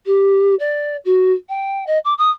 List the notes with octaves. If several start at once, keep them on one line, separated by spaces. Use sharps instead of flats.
G4
D5
F#4
G5
D#5
D6
D#6